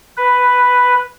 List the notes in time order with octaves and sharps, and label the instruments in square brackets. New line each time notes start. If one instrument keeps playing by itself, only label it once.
[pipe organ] B4